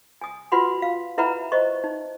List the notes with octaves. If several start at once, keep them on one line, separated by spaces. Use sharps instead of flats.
G#5 D#6
F4 F#4 B4 F#5 B5 C6
F5
E4 B4 E5 F#5 A#5 B5
C5 D#5 C#6
D#4